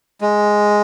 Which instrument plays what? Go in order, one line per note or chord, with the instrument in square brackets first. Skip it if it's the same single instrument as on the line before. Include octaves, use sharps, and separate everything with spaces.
[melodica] G#3